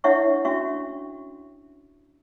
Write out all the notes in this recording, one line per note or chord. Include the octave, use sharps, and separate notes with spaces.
D4 E4 C#5 E5 F#5 C#6
C#4 D4 F#4 E5 C#6